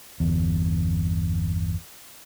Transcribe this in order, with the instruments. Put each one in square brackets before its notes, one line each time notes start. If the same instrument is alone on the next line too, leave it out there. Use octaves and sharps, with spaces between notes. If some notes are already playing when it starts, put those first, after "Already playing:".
[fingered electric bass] G1 E2